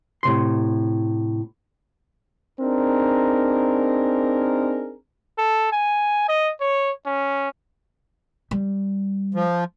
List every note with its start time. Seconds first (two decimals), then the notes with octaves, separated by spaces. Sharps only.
0.23 A2 C3 C6
2.61 C4 D4 D#4 G#4 A#4
5.38 A4
5.72 G#5
6.29 D#5
6.61 C#5
7.06 C#4
8.51 G3
9.34 F3